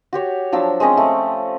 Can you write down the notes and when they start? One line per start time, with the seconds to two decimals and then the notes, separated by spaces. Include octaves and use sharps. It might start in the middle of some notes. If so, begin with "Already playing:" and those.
0.13 F#4 G4 C#5
0.52 F3 F#3 D4 E6
0.80 G#3 C4 C#4 D#5
0.97 A3